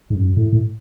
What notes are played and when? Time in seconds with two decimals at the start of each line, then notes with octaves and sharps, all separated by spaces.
0.10 G#2
0.15 F#2
0.37 A2
0.52 A2